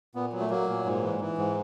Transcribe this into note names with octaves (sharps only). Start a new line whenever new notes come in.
A#2 B3
F#3
A3
F#3 A#3
A#2
G#2
E3
E3
G#2